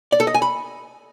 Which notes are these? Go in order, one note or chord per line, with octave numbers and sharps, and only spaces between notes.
D5
A4
D#5
G#5
B5